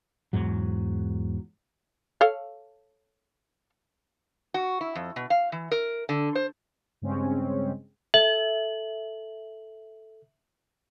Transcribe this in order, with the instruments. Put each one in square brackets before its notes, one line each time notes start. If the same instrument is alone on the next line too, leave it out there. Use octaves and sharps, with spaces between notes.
[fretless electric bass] E2 G#2 F#3
[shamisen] A4 C#5 F5
[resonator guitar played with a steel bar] F#4
E4
F2
B2
F5
E3
A#4
D3
C5
[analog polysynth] G2 C#3 G#3 C4 C#4
[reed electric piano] A4 [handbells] E5 [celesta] F#7